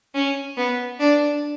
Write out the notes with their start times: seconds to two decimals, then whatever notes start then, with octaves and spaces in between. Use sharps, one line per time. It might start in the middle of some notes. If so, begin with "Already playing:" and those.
0.15 C#4
0.57 B3
1.00 D4